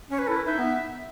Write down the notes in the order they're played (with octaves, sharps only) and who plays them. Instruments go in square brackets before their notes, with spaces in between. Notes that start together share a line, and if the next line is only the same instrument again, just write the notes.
[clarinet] C#4 [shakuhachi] C#5
[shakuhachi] B4
[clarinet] E4 [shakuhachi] A4
[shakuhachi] B4
[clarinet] D#4 [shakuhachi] E5
[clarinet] B3